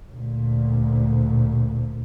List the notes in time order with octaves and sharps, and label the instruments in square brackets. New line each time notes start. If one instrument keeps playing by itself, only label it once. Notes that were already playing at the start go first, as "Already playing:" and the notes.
[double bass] D2 A#2